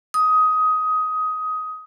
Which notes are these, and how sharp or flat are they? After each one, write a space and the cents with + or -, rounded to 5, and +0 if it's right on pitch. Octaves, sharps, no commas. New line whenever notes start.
D#6 +15